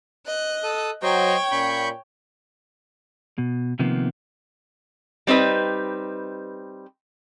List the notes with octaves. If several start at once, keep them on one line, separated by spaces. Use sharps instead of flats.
D#5 F#6
A4 D#6
F#3 C5 C#5 D#5 G5
A#2 C#4 B5 C#6 G6
B2
C3 D#3 F3 A#3 B3
G3 C4 D#4 B4